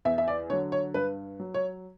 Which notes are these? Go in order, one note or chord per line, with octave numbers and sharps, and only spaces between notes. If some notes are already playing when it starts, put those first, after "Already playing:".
E2 E5
E5
D5
D3 F#3 C#5
C#5
G2 B4
F#3
C#5